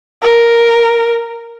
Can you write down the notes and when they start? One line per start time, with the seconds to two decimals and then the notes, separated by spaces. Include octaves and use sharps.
0.22 A#4